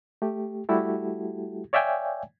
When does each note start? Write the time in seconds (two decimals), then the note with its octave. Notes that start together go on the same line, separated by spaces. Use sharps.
0.22 A3 G4
0.69 G3 A3 E4 F#4 G4 A4
1.73 C#5 D5 E5 F5 G5 G#5